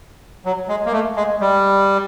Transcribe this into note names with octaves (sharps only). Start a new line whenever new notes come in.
F#3
G#3
A#3
A3
G#3
G3